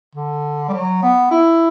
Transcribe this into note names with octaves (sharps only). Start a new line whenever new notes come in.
D3
G3
F#3
B3
E4